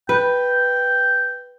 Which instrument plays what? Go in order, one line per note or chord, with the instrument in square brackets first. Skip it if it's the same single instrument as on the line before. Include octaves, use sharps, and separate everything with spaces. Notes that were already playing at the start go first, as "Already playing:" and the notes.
[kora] B4 [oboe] G5